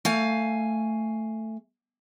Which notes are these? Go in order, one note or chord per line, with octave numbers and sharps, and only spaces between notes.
A3 F5 G#5